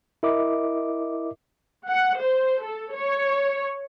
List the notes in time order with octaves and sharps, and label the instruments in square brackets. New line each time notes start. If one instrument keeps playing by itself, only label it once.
[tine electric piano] E4 A#4 D#5 E5 D6
[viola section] F#5
C5
A4
C#5